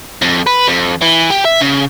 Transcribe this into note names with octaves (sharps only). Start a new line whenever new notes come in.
F2
B4
F2
E3
G4
E5
C#3